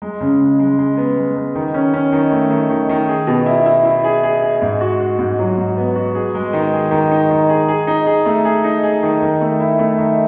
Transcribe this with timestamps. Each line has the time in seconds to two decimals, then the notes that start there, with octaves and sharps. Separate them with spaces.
0.02 G#3
0.21 C#3
0.40 G#3
0.59 G#3
0.79 G#3
0.97 B3
1.17 G#3
1.36 B3
1.55 D#3
1.74 C#4
1.94 C#4
2.12 D#3
2.32 A3
2.50 D#3
2.70 D#3
2.89 D#3
3.09 G#4
3.27 B2
3.46 E4
3.66 E4
3.85 E4
4.04 G#4
4.23 G#4
4.42 G#4
4.62 G#2
4.81 F#4
5.00 F#4
5.19 G#2
5.39 F#3
5.57 G#2
5.77 B3
5.96 F#4
6.15 G#4
6.35 G#3
6.53 D#3
6.73 G#4
6.91 D#3
7.11 D#4
7.30 D#3
7.49 G#4
7.68 G#4
7.87 D#4
8.06 G#4
8.26 A3
8.45 G#4
8.64 D#4
8.83 G#4
9.03 D#3
9.22 D#3
9.41 A3
9.60 E4
9.79 A3
9.98 D#3